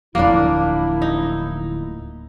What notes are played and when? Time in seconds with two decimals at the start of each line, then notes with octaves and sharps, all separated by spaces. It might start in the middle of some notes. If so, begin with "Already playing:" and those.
0.15 D1 A#1 F3 A#3 D4 E4
1.02 D#4